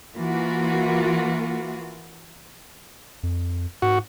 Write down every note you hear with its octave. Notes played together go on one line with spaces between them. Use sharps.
E3 A#3 F4 F#4
F2
G#2 F#4